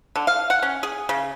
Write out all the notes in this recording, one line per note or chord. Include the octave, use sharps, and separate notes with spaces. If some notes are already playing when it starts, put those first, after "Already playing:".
D3
F5
F#5
C#4
G#4
C#3